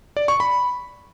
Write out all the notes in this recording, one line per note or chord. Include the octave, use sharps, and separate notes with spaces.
D5
C#6
B5